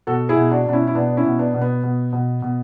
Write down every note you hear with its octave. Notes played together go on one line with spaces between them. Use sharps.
B2 F#4 A4
E4 G#4
B2
D4 F#4
B2 D4
C#4 E4
E4
B2 B3 D4
C#4 E4
B2
B3 D4
B2
B3
B2
B2
B2